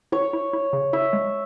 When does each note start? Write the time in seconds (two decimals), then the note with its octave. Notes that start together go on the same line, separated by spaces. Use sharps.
0.12 E4 C#5
0.33 E4
0.53 E4
0.73 C#3
0.93 E4 E5
1.13 G#3